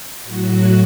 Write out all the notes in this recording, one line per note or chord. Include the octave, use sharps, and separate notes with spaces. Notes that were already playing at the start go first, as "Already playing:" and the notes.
A2 F#3 F#4